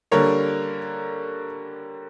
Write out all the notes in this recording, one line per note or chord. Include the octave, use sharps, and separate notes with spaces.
D3 G3 A#3 A#4 C#5